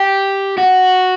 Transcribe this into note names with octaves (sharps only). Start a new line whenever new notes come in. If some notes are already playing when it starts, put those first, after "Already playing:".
Already playing: G4
F#4